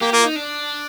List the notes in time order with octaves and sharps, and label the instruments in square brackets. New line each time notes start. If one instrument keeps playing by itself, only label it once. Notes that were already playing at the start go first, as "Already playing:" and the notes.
[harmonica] A#3 [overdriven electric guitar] G4
[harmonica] A#3 [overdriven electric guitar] F4
[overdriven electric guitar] D#4
D4